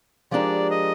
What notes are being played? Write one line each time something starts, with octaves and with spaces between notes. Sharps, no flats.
F3 G#3 D4 G4 A#4 D5
D#5